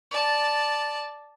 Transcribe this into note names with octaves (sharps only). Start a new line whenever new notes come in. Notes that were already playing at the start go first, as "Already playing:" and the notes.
D5 A5